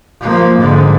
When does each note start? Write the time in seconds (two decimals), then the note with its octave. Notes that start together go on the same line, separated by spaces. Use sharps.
0.21 F3 A#3
0.58 G#2 D3